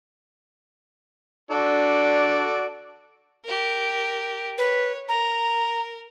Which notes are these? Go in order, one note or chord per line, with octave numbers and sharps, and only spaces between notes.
D4 F#4 A4 D5
G4 A#4
B4 C#5
A#4 A#5